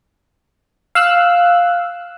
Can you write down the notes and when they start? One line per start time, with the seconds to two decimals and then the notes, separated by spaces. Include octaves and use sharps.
0.95 F5 E6 F#6